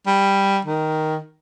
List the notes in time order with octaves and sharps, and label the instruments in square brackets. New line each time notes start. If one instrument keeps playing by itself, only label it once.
[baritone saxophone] G3
D#3